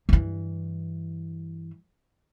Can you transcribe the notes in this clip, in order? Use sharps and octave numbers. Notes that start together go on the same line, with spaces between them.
G2 E3